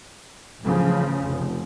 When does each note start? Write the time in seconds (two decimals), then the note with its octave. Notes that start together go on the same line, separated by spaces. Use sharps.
0.62 A1 C#3 F3
1.24 F1